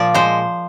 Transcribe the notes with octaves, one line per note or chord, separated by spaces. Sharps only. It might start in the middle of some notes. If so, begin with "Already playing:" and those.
Already playing: A#2 F3 D5
G#3 C5